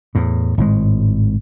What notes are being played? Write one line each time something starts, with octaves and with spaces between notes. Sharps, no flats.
E2 A2
G#1 A2 G#3